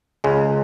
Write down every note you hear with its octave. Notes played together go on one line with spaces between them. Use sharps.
C#2 C#3 G#3